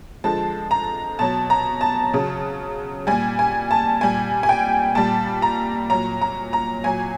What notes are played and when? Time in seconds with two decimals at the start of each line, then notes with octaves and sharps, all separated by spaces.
0.24 D3 F3 G#3 A5
0.71 A#5
1.19 B2 F#3 A5
1.50 A#5
1.81 A5
2.13 C#3 F#3
3.07 A#2 G3 G#5
3.39 G#5
3.71 A5
4.01 A#2 G3 G#5
4.43 G#5
4.49 G5
4.95 A#2 G3 A5
5.42 A#5
5.90 A#2 F#3 A#5
6.22 A#5
6.53 A#5
6.84 A#2 F#3 G#5